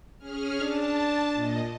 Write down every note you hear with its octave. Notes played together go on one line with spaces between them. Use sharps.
C#4 G#4 F6
D4 A5
A#2 D#5